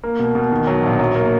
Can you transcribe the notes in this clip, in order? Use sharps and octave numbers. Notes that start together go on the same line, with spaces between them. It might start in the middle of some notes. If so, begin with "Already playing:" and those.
A#3
B2
B2
D#3
F#3
A#1
F#3
A#3